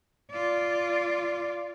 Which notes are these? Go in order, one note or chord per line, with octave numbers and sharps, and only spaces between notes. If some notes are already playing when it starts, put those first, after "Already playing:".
F4 D5